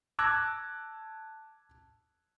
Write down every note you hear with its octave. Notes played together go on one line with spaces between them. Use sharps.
A5 D6 E6 F#6 G#6 A#6